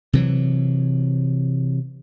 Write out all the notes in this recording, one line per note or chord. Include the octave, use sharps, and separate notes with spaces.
C3 E3 F#3